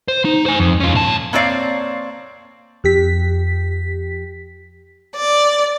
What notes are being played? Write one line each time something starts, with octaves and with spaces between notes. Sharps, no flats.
C5
D#4
C5 G#5
F2
C#4 F4
A#2 A5
A#3 C4 C#5 D5 F5
F2 G4 B6
D5